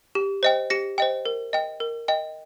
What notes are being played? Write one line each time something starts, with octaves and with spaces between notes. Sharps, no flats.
G4
C5 D#5 G5
G4 A#6 C#7
C5 D#5 G5
A#4
D#5 G5
A#4
D#5 G5